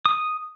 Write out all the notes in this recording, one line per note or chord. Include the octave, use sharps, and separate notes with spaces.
D#6